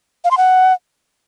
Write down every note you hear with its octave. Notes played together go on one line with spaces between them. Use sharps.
F5
C6
F#5